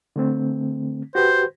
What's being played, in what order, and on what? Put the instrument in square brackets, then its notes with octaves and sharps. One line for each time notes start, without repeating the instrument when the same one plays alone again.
[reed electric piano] D3 A3 C4
[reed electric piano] F#4 G4 B4 [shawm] C5